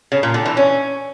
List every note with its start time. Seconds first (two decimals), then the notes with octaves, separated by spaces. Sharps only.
0.12 C#3
0.23 A#2
0.34 D3
0.46 E3
0.57 C#4